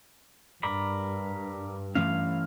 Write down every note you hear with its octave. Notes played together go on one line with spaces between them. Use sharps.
G2 A#4 D5 B5
E3 A3 C#4 F5